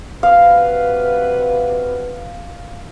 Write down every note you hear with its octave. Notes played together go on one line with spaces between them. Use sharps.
C3 F#4 B4 F5